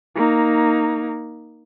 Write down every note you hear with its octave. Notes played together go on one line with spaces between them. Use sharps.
A#3 D#4